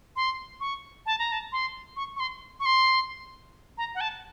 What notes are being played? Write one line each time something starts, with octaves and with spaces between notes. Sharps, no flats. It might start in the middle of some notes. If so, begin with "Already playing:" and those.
C6
C#6
A5
A#5
A5
C6
C#6
C#6
C6
C#6
C6
A#5
F#5
A5